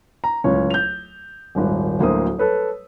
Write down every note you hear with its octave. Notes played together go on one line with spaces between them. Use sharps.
A#5
D1 C#2 C#4 C#5
G6 F7
D#1 G#1
D1 D2 A#3 C5 D#6
A4 B4 C#5